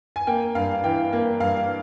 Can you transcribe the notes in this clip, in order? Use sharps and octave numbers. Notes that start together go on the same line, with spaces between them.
G#5
A#3 G5
G2 F5
E3 G5
A#3
G2 F5